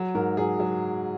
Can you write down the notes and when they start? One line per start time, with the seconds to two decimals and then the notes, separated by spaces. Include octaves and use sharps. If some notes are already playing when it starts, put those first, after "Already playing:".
Already playing: F#3
0.15 G#2 A#4
0.37 F#3 G#4
0.60 F#3